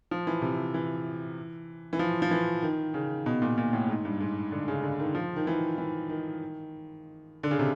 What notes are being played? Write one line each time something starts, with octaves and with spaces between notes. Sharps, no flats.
F3
E3
C3
E3
E3
F3
F3
E3
D#3
C#3
B2
A#2
A#2
A2
G#2
G2
G#2
D3
C#3
D3
D#3
F3
D#3
E3
E3
D#3
D3
C#3
C3